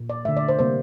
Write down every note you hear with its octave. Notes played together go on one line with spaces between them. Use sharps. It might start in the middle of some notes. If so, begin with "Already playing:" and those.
Already playing: A#2
D5
D3 A3 E5
D5
C5
C3 G3 A#3 C5